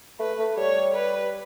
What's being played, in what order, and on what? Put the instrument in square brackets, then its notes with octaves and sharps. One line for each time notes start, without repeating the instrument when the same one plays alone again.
[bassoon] A3 [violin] B4
[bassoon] A3
[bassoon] G3 [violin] C#5
[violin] B4